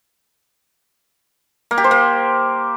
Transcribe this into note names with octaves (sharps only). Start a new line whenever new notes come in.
A#3
G4
C5
A#3